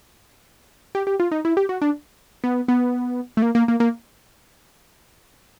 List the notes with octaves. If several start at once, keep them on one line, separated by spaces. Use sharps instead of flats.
G4
G4
F4
D#4
E4
G4
F#4
D4
B3
B3
A3
A#3
A#3
A#3
A#3